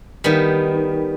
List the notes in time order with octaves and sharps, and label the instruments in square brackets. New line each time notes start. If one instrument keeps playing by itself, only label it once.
[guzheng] D#3 G3 B3